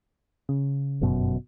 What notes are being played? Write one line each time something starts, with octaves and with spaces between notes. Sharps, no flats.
C#3
G1 F#2 B2